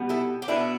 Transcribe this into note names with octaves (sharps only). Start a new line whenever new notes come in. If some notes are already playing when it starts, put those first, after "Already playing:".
Already playing: B2 G3 B3
E4 A4
G4
B2 B3 D4 E4